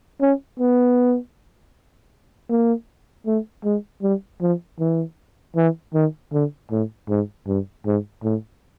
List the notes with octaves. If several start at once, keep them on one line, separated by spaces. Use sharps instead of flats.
C#4
B3
A#3
A3
G#3
G3
F3
E3
E3
D#3
D3
A2
G#2
G2
G#2
A2